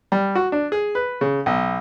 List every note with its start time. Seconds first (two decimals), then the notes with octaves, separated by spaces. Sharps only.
0.12 G3
0.35 F#4
0.52 D4
0.72 G#4
0.95 B4
1.21 C#3
1.46 B1